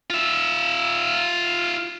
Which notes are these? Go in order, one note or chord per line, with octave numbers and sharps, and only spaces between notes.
F4 E5